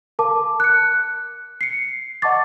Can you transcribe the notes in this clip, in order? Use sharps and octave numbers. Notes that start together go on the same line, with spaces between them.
A#4 F5 A5 D6
F#6 C#7
C7 C#7
D#5 F#5 A5 C#6 D6 A6